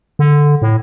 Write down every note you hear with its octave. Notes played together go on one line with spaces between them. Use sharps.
D3
A2